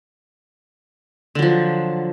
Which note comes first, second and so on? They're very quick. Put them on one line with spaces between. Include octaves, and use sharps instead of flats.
D3 F#3 F3